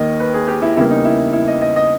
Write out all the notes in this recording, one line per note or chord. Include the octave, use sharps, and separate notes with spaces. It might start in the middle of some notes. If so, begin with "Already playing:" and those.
Already playing: D#2 D#3 A#3 D#5
B4
G#4
G4
E4
E2 C#3 G3 A#3 E4
D#4
E4
E4
D#5
D#5
D#5